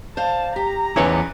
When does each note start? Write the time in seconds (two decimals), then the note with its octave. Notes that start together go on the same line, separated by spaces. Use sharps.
0.17 C5 D5 F5 A5
0.56 G4 A#5
0.96 E2 C#3 E3 E4 B4 C#5 D5